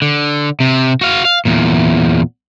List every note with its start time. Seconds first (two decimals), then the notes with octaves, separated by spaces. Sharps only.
0.02 D3
0.60 C3
1.01 F#4 F5
1.25 F5
1.45 E2 A#2